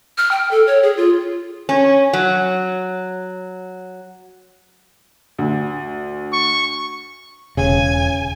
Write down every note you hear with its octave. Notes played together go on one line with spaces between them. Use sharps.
F6
G5
A4
C#5
G#4
F4
C#4
F#3
D2
C#6
E1 C#3 G#5